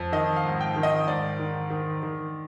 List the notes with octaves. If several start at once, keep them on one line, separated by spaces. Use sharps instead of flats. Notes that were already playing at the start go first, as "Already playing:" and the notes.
Already playing: F2
D#3 D#5
F5
G#2
G5
D#3
D#5
G#2 D5
D#3
D#3
D#3